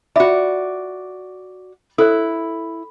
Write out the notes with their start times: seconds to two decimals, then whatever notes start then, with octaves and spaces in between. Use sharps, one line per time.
0.16 F4 F#4 D5 E5 B5
1.98 E4 A4 C5 C#5